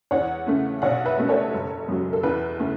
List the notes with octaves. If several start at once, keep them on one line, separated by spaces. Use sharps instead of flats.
E2 C#5 F#5
C#3 A3 C#4
B1 C#5 F#5
B4 E5
B2 A3 C#4
A4 C#5
F#1
F#2 F#3
A4
E2 B4
C#3 A3 C#4